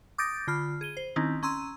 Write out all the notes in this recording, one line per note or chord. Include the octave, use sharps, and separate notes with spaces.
D6 D#6 G6 A6 A#6 D7
D3 F4 B5 F6
G#4 D#7 G7
C5
D#3 C4 C#4 D#4 E4
C#4 A#5 C6 E6 D#7